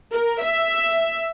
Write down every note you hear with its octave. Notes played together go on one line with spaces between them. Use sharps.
A#4
E5